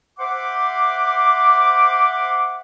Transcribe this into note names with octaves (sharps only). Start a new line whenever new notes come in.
C5 E5 F#5 C6 D6